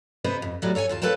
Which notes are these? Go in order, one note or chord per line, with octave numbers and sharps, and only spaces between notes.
C3 B3 B4 C5 D#5
F2
A2 F#3 G3
A4 C#5 F#5 G#5
D#2 F4 A5
A#3 A4 B4 C#5 G5 A5